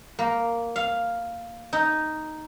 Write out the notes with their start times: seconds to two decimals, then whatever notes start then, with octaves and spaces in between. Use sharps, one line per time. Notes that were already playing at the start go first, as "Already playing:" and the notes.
0.19 A#3
0.76 F5
1.73 D#4